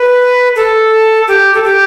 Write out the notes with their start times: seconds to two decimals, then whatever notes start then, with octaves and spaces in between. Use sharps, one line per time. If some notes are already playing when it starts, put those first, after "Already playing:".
Already playing: B4
0.56 A4
1.27 G4
1.54 A4
1.64 G4